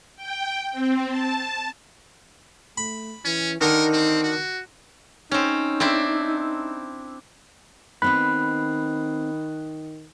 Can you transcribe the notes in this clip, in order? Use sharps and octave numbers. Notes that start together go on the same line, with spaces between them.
G5
C4
A5
A3 B5
E3 C#4
D3 D#3 D#4 A#4
C4
F#4
C4 C#4 D#4
C4 D4 E4
D#3 B3 C4 D#5 B5 F#6